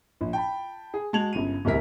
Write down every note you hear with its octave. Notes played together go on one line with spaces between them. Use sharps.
A#1
G5 A5 B5
G#4
G#3 F#4 A5 G#6 F7 F#7
G1 C#3 D#7
D1 C2 C3 A#4 B6